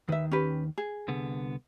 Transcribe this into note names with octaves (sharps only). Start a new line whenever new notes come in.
D#2 D#3 B4 E5
C#4 G4 B4
G#4
C2 D3 B3